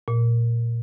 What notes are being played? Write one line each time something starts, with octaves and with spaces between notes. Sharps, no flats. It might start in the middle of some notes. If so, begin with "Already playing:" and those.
A#2